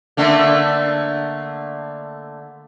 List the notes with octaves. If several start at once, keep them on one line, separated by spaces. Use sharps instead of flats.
D3 A3 A#3